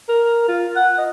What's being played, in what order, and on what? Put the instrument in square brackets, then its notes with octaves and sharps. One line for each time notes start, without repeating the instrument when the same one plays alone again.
[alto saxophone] A#4
F4
F#5
D#5